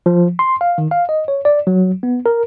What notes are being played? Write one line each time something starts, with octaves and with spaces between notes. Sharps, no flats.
F3
C6
F5
D#3
F5
D#5
C#5
D5
F#3
B3
A#4